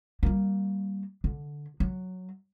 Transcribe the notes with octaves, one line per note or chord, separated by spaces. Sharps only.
G3 A#3
D3
F#3